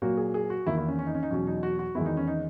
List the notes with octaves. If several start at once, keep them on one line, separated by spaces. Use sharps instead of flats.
A#2 F#3 A#3 F#4
G#4
G#4
F#4
E2 D#3 A#3 E4
E4
C#4
C#4
D#4
C#4
D#4
E2 B2 F#3 C#4
D#4
F#4
F#4
E2 D#3 G#3 B3 E4
D#4
C#4
D#4